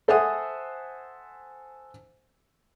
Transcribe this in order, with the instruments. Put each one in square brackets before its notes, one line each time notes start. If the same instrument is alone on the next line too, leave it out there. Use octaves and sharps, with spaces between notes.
[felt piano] A4 C5 E5 F#5 G#5 D#6